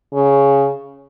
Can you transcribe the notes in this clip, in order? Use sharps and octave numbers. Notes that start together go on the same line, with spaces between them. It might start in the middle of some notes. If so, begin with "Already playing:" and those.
C#3